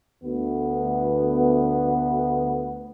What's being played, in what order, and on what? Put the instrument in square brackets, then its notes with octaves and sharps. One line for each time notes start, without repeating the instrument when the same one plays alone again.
[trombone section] D2 B3